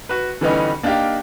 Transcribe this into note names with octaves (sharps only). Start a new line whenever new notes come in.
F#4 B4
D3 E3 G3 B3 C#4 D#4
A#3 D4 D#4 G4 F5 G5